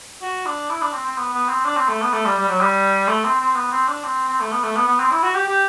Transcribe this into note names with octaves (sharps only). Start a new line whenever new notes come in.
F#4
D4
E4
D4
C4
C4
B3
B3
C4
D4
C4
A3
B3
A3
G3
G3
F#3
G3
A3
C4
C4
B3
C4
D4
C4
C4
A3
B3
A3
B3
B3
C4
E4
F#4
G4
G4